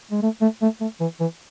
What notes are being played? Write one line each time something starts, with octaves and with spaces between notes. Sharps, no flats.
G#3
A3
A3
A3
A3
E3
E3